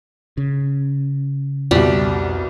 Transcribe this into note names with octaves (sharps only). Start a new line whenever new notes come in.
C#3
C2 F2 B2 G3